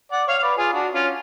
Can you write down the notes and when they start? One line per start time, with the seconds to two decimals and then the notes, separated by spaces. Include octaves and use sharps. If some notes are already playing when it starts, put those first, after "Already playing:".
0.12 D5 F#5
0.28 C#5 F5
0.39 F5
0.42 B4 D5
0.58 F4 G#4
0.73 D4 F#4
0.93 C#4 F4